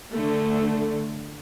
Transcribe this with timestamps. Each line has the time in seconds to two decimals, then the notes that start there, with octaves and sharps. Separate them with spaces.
0.14 D3 A3